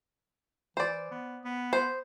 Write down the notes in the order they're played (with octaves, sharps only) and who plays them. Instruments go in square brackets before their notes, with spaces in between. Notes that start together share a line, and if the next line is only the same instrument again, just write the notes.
[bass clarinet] E3 [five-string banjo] C5 D5
[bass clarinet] B3
B3
[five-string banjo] C5